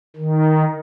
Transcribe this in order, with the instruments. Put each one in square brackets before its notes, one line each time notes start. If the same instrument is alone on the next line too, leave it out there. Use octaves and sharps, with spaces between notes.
[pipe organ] D#3